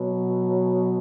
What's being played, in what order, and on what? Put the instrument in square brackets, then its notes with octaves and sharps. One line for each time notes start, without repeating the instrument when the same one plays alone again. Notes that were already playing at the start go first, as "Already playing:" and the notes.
Already playing: [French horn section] B2 F#3